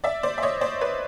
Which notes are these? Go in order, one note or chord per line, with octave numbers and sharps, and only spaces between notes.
D5 E5
C5 D5
E5
C#5 D#5
C5 D5
B4 C#5